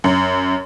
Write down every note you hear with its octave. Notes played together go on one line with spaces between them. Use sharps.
F#2